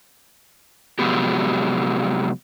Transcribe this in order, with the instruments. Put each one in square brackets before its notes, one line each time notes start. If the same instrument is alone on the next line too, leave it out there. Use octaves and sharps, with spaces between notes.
[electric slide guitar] C3 F3 F#3 G#3 B3 G4